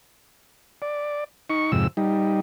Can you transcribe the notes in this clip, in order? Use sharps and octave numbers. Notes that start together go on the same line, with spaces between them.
D5
D#4 C#6
F2 G#2 C3 E6
G3 D#4